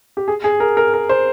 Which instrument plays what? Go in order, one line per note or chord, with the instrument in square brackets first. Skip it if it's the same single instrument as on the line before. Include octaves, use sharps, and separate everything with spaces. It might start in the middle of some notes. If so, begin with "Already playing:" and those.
[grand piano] G4
G#4
G#4
A#4
A#4
A#4
C5